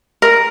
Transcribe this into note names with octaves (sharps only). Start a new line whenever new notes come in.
A#4